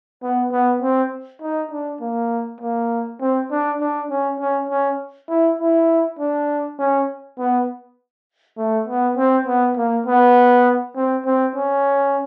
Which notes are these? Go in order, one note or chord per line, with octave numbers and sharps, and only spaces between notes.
B3
B3
C4
D#4
D4
A#3
A#3
C4
D4
D4
C#4
C#4
C#4
E4
E4
D4
C#4
B3
A3
B3
C4
B3
A#3
B3
C4
C4
C#4